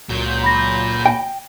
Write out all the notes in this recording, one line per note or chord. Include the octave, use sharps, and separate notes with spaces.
C#2 A#2 F#3 G6
B5 A#6
G5